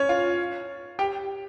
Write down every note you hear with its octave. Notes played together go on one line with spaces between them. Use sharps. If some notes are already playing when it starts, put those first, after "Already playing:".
Already playing: C#4 C#5
F4 F5
G4 G5